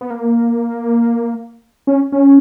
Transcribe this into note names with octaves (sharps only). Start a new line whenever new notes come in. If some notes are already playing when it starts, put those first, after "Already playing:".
B3
A#3
C#4
C#4